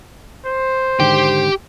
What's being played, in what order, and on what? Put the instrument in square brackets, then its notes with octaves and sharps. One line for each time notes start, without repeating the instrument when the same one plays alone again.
[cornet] C5
[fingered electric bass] G#2 D3 D#3 [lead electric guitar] G4 G5